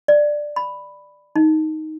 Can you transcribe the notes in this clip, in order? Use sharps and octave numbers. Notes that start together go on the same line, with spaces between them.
D5
B5
D#4